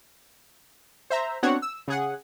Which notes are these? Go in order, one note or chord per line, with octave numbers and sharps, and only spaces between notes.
C5 E5 A#5
B3 C4 D4 F#4 C#5 F#5
E6
C#3 G#4 F#5